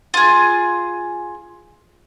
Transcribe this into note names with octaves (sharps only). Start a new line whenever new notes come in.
F4 G#4